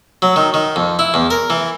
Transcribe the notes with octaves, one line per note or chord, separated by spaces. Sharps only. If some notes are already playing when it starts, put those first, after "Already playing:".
F#3
D#3
D#3
F2
E4
E2
A#4
E3